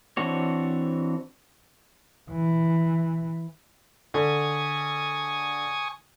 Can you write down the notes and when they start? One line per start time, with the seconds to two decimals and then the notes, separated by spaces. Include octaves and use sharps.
0.17 E3 C4 D4 F#4 C#5
2.31 E3
4.14 D3 G#5 C#6 D#6